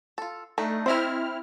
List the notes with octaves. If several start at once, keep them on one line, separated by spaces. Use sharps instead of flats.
F4 A4
A3 D4 D#4
C4 E4 C5 D#5 E5 F6